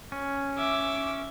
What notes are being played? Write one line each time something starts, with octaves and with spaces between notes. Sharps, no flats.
C#4
E5 D6